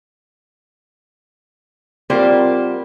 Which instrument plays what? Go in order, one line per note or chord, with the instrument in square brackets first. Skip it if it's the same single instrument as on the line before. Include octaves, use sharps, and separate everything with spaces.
[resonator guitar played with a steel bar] G3 A#3 C5 [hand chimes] C4 F4 A#4
[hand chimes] F#5